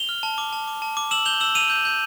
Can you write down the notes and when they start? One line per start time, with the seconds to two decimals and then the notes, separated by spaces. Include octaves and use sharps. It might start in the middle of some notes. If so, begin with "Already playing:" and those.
Already playing: F7 G7
0.09 F6
0.23 A5
0.38 D6
0.53 A5
0.67 D6
0.82 A5
0.97 D6
1.11 E6 E7 F#7
1.25 G6 F7 G7
1.40 E6 E7 F#7
1.55 E6 D#7 F7
1.70 G6
1.85 G6